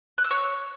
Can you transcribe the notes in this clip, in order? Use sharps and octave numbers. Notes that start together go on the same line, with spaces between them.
F#6
E6
C#5